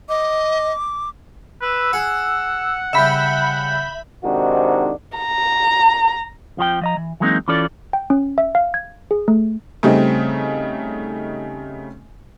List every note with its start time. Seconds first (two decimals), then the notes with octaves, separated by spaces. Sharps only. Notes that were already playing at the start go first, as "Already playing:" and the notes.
0.09 D#5 D6
1.62 B4 E6
1.93 G#4 F#5
2.93 C#3 G3 E5 B5 G6
4.24 G#2 C3 D#3 D4 F#4
5.18 A#5
6.57 F2 F3 F#4 G5
6.81 F3 D#5 A#5
6.97 E3
7.20 E3 F#3 G#3 A#3 C4 D#4
7.48 E3 C#4 F4 A4 D5
7.93 G5
8.10 C#4
8.38 E5
8.55 F5
8.74 G#6
9.11 G#4
9.28 A3
9.83 C#3 G3 A3 C4 D#4